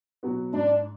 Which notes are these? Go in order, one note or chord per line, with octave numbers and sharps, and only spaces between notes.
B2 F#3 B3 F#4
G#2 D4